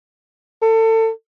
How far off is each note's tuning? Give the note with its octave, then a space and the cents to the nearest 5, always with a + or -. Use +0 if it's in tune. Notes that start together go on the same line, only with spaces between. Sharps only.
A4 +30